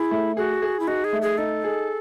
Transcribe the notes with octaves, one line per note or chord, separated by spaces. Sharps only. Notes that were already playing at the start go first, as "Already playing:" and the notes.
Already playing: E4 G#4
A3
F#4 G#4
G#4
E4
D#4 F#4
G#4
A3
G#4
D#4 A4
G#4